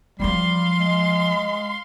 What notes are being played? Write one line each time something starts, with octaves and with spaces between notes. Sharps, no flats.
E2 F3 G3 F5 C6
G#3